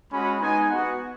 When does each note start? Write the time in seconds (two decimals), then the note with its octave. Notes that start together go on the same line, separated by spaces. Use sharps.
0.11 G#3 C#4 F#4 B5
0.40 G#3 B3 D#4 G#5
0.69 B3 F#4 F#5